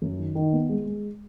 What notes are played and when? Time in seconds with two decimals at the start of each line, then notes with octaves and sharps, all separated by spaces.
0.02 F#2
0.19 D#3
0.35 D#3
0.53 B3
0.69 G#3
0.86 G#3